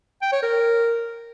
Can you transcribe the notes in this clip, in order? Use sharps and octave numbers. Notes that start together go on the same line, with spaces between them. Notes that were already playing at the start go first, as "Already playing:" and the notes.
G5
C#5
A#4